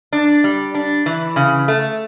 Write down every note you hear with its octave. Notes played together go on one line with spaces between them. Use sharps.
D4
G3
D4
E3
C#3
A3